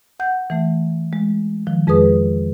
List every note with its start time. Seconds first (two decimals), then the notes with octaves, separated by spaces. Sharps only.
0.20 F#5 G6
0.50 E3 A3
1.13 G#3
1.67 D#3 F3
1.87 F2 G#3 G#4 B4 D#6